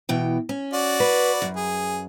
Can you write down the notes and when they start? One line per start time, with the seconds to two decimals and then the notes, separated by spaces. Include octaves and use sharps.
0.09 B2 E3 G5
0.49 C#4
0.73 F#4 D5
1.00 B4
1.42 F#2
1.56 G#4